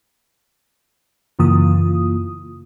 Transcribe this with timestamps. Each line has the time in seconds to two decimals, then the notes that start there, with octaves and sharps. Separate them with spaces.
1.39 F#2 C#3 E3 A#3 F4 D#6